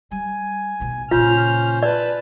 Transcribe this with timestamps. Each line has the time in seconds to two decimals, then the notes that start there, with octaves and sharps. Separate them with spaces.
0.11 G3 G#5
0.80 B1 B2
1.11 A#2 C#3 C#4 F4 C5 F6
1.83 B4 D5 A5